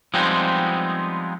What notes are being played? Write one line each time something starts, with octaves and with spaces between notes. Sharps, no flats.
F3 G3 G#3 B3 C4 D#4